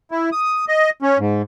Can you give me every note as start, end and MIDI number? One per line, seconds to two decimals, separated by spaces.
0.11 0.30 64
0.32 0.65 87
0.68 0.90 75
1.02 1.18 61
1.19 1.42 44